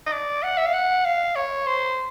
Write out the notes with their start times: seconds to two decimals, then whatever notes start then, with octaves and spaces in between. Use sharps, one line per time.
0.06 D#5
0.12 D5
0.43 F#5
0.57 E5
0.66 F5
0.74 F#5
1.05 F5
1.35 C#5
1.67 C5